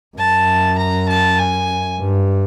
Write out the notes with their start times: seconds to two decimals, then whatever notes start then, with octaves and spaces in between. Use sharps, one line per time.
0.17 F#2 A5
0.78 A#5
1.09 A5
1.39 G#5
1.99 G2